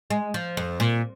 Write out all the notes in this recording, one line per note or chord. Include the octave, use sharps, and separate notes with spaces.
G#3
F3
F2
A#2